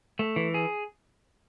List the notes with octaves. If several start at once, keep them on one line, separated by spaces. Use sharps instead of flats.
A3
E3
G#4